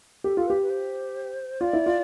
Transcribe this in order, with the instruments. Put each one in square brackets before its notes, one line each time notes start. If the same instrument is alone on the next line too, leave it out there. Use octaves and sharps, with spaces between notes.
[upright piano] G4 [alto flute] A4
[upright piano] F4 [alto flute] A4
[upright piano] G4 [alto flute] B4
[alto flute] B4
C5
[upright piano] F4 [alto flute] D5
[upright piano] E4
F4